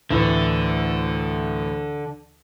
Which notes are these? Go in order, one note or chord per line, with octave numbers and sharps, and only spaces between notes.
D2 A2 D3 E3